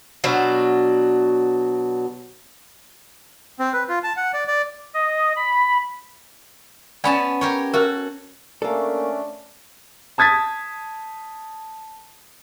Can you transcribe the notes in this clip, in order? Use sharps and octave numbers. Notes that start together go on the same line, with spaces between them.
B2 F#3 D4
C4
B4
F4
A5
F#5
D5
D5
D#5
B5
B3 C#4 D5 G#5 A5 B5
G4 A#4 C#5
F#4 A4 A#4 C5
A3 A#3 C#4 D4 A4
A5 D#6 G#6 A6 B6